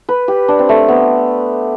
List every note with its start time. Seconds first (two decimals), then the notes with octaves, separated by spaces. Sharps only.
0.09 B4
0.28 G4
0.48 D4
0.59 C4
0.69 A3
0.88 B3